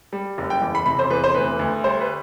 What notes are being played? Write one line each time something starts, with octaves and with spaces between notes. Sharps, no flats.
G3
F#1
G5
E2
B5
C3 B5
C5
E2 B4
C5
D2 B4
D2
G3 C5
B4